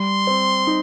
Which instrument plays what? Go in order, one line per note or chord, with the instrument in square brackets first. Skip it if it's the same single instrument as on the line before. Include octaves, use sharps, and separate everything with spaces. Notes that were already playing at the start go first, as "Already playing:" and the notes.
Already playing: [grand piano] G3 [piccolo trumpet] C6
[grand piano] C4
D#4